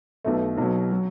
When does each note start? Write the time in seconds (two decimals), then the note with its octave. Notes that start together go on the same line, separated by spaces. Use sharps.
0.24 B1 B2 A3
0.57 B1 B2 F#3
0.91 F#3